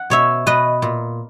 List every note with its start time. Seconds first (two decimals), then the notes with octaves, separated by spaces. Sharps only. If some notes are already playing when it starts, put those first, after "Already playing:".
Already playing: F#5
0.10 B2 C#5 E5
0.46 B2 B4 D#5
0.82 A#2